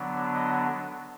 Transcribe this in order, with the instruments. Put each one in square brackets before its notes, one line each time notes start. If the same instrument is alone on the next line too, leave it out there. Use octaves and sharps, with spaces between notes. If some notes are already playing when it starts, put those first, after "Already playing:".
Already playing: [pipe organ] D3 F#3 B3 D4
D#5